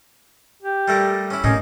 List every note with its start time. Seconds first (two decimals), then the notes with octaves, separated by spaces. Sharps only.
0.62 G4
0.88 G3 A3 A#4
1.30 C#4 E4
1.44 A2 C3 A#3 C#4 D#4